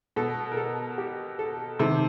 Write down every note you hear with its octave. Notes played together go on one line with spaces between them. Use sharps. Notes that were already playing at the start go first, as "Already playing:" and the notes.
B2 A4
A#4
A4
G4
A4
C3 D#3 A4